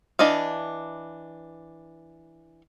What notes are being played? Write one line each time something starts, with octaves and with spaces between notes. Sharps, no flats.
E3 D4 D#5 F5